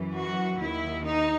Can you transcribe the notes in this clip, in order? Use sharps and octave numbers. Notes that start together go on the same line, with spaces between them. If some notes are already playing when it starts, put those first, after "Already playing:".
Already playing: F#2 E3
F#4
D#2 D#3 E4
D#4